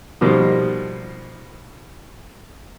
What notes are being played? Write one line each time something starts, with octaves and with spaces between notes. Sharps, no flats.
B2 F3 G3 A#3 D#4